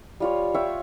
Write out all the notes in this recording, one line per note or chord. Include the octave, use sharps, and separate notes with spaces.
G3 F4 C#5
F4 C#5 E5 G5